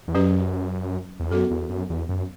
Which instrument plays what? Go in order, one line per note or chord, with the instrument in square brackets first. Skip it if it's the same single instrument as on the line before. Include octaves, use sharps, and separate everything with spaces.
[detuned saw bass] E2
[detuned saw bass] F#2 [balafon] F#3 C#4 G4 B4
[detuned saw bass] E2
[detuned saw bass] F#2 [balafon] B3 F#4 A4
[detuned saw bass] E2
F#2
E2
F#2